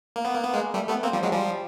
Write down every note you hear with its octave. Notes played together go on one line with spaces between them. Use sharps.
A#3
B3
A#3
B3
G#3 A#3
G3 A3
A3 B3
A#3 C4
F3 G3
F#3 G#3
F3 G3